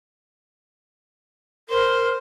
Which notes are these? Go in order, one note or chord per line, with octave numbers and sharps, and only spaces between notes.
A#4 C5